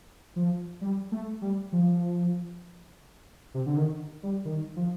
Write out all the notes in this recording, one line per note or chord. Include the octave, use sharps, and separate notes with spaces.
F3
G3
A3
G3
F3
C3
D3
D#3
G3
D#3
F3